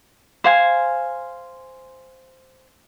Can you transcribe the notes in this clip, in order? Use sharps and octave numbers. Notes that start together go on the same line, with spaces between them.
C5 F5 G#5